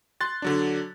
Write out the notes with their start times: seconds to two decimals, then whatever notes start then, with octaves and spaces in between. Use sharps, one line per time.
0.21 C6 F#6 A6
0.42 D3 F#3 D4